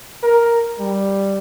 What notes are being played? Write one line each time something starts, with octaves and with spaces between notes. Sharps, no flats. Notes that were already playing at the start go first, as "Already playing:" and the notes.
A#4
G3